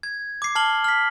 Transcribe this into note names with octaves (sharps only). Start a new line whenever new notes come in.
G#6
D6 C7
A5 F6 C7 F#7 G7
F6 B6